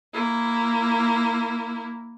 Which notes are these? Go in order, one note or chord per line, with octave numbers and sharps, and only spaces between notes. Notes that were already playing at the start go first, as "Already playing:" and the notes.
A#3 E4